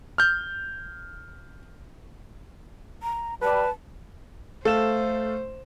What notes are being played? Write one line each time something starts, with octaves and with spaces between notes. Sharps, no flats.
F6 G6
A#5
G3 B4 A5
A3 A4 C5 F5 E7